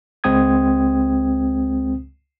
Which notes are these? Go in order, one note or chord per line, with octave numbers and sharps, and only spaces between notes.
C#2 G#3 C4 G5 D#6 G#6